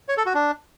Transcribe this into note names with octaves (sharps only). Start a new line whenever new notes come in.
C#5
A4
F#4
D4